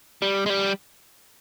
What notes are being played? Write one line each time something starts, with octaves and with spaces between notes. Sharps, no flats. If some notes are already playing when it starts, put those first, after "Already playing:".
G3
G#3
G3